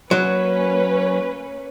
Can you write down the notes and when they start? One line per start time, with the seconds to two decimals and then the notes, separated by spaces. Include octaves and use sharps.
0.11 F#3 A#3 C#4 B4